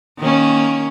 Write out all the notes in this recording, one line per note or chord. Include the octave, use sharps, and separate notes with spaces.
D#3 A#3 C#4